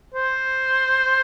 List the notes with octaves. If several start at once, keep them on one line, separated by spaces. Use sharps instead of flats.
C5